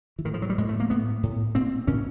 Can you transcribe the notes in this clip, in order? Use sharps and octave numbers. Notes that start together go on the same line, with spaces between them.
E3
A2 D#3
F3
F#3
G3
A2 G#3
A3
A#3
A2 B3
A2
A#2 C4
A#2 C#4